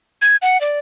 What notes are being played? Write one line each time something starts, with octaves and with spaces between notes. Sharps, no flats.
G#6
F#5
D5